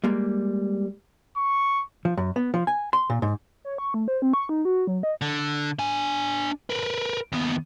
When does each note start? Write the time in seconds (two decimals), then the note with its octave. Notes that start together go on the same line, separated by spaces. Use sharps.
0.04 G3 G#3 A#3
1.37 C#6
2.05 F3
2.17 F#2
2.36 B3
2.54 F3
2.67 G#5
2.93 C6
3.10 A#2
3.22 G#2
3.65 C#5
3.78 C#6
3.94 A3
4.08 C5
4.22 C4
4.34 C#6
4.49 D#4
4.65 F#4
4.87 F#3
5.03 D#5
5.21 D3
5.79 D4 G#5
6.70 A#4 B4
7.32 D#2 B3